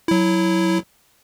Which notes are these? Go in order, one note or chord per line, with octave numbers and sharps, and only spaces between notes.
F#3 E4